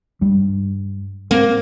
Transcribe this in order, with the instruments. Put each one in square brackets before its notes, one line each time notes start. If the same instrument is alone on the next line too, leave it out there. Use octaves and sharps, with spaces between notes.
[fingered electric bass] G2 G3
[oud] A#3 [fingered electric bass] C4